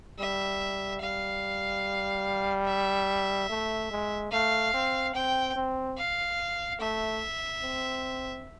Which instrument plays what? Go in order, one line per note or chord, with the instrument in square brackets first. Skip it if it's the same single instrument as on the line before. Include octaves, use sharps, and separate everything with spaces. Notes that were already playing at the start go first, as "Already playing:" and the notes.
[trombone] G3 [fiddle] E5
[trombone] G3 [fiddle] F5
[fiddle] E5
[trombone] A3
G#3
[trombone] A3 [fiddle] F5
[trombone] C4
[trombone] C4 [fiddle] G5
[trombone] C4
[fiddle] F5
[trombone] A3 [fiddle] E5
[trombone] C4